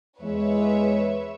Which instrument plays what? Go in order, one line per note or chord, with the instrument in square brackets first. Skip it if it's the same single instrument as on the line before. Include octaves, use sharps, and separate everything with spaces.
[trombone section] E2 G#3 [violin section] B4 C#5 E5